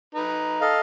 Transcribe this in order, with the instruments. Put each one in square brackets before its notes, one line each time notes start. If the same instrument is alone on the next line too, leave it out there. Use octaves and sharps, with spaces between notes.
[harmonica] D#4 B4
[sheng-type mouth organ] A4 D#5 F5